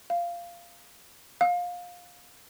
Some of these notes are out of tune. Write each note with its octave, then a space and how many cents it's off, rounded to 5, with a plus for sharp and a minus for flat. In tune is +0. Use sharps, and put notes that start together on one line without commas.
F5 -10
F5 +20